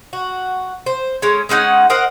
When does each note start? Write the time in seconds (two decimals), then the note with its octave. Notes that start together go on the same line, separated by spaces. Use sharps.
0.13 F#4
0.86 C5
1.22 G#3 A3 C#4
1.49 G#3 C#4 D#4 F#5
1.90 A#4 C5 D#5 F#5